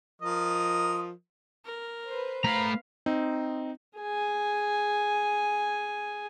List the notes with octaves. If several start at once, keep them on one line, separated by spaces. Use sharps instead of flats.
F3 A#4 D#5
A#4
B4 C5
A3 F5 A#5 B5
C4 D#4
G#4 G#5